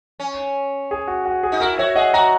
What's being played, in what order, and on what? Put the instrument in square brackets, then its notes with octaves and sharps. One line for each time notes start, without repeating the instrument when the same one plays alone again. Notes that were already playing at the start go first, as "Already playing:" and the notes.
[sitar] C#4
[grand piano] G#4
F#4
F#4
G#4
[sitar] D#4
[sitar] E4 [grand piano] F#4 A#4
[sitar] F#4 [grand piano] C#5 E5
[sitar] G#4 [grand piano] D#5 F#5
[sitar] F#4 [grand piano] F#5 A#5